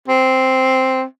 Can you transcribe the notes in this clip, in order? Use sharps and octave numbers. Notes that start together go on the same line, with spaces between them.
C4